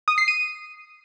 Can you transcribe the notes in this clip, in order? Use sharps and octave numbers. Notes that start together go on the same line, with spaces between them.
D#6
C7
D#7